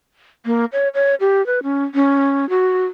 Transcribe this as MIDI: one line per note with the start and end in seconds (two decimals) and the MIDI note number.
0.46 0.65 58
0.73 0.88 73
0.94 1.15 73
1.20 1.44 67
1.46 1.63 71
1.63 1.84 61
1.94 2.48 61
2.49 2.86 66